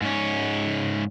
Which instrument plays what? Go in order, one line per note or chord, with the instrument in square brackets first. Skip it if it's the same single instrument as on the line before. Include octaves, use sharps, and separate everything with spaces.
[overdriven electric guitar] G#2 C#4